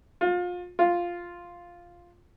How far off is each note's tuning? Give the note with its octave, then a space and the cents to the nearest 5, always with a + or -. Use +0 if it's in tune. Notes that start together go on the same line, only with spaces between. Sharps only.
F4 +30
F4 +0